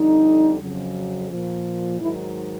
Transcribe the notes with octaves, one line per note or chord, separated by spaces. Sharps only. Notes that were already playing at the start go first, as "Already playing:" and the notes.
Already playing: F2 D3 G3 D#4
F2 C#3 F#3
A#2 F3
G#2 D#3 F#3 E4